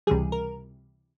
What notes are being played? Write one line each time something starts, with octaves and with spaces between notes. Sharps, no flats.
C#2 C3 E3 G3 G#4
A#4